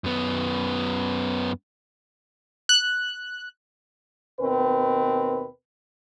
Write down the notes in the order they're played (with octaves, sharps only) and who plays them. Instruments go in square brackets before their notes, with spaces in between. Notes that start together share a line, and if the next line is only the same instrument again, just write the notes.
[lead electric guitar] F#2 B3
[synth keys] F#6
[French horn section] D#2 B2 C4 A#4 B4